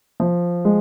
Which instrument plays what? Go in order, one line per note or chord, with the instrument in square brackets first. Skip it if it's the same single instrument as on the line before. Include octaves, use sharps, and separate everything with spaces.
[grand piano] F3
G#3